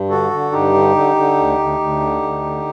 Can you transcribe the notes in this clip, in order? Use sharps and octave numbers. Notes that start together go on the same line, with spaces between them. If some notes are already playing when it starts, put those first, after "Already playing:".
Already playing: G2
D3 F#4 A4
D3
G2 D#4 G4
D3
D3
D3
D2
D2
D2
D3
D2
D3